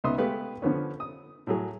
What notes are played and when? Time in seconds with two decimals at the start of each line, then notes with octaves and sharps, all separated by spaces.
0.04 C#2 B3 D#4 E5 C6 D#6
0.18 G#3 A3 B3 G4 B4 F5
0.62 D3 F3 B3 C#4
1.00 D#6
1.47 A2 F#3 G#4